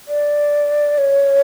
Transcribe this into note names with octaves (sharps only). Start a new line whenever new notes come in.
D5
C#5